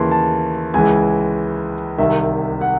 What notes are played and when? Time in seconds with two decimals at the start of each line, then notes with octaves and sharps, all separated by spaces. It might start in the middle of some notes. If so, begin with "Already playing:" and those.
Already playing: D#2 C#3 E3 A5 C6
0.11 A5
0.74 C#2 C#3 E3 G#5
1.98 C2 C3 D#3 E5
2.61 F#5